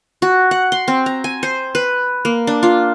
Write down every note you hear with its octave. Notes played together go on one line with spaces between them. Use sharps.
F#4
F#5
C6
C4
A#5
G#5
C5
B4
A#3
D4
F4